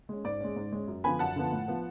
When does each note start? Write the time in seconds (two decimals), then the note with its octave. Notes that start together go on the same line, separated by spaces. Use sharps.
0.09 G#3 C#4
0.24 G#2 D5
0.40 G#3 C#4
0.56 G#2
0.72 G#3 C#4
0.88 F#2
1.04 D3 F3 B3 G#5 B5
1.19 F#2 F#5 A5
1.36 D3 F3 B3
1.52 A2
1.68 F3 B3